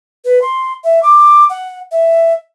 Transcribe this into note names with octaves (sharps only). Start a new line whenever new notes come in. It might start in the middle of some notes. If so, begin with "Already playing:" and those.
B4
C6
E5
D6
F#5
E5